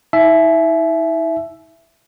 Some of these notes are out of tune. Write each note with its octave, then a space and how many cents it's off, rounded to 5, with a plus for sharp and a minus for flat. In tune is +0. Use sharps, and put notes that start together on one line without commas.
E4 -45 E5 +10 G#5 +45